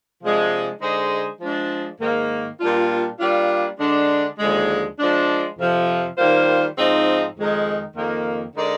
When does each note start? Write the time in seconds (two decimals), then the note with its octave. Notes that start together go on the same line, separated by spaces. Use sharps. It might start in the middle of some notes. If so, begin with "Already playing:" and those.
0.22 C3 F3 G#3 D4
0.81 D3 G#3 D#4 G#4 C5
1.41 F3 G#3 D4
2.00 G#2 D#3 A#3
2.60 A#2 G3 A#3 D4 F4
3.20 G3 A#3 D4 F4
3.79 D3 G#3 D4
4.38 D#2 D3 F3 G#3
4.99 F3 G#3 D4
5.59 F2 C3 F3
6.17 D#3 G3 A#3 F4 C5
6.77 G#2 F3 C4 D#4
7.37 F2 D#3 G#3 D#4
7.96 F2 D#3 A#3
8.56 D3 G#3 D#4 A#4 D5